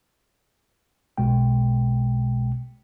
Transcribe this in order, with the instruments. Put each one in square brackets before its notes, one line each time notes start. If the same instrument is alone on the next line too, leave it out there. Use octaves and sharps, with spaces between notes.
[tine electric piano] B1 B2 G#3 G5